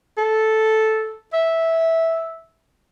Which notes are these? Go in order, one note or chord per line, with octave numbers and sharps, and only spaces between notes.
A4
E5